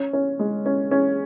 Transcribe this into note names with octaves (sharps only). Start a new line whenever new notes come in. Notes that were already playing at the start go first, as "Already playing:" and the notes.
Already playing: C#4
C#4
G#3
C#4
C#4